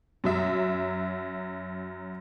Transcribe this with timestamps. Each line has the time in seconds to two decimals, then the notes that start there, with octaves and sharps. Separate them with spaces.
0.24 F#2 F#3 E5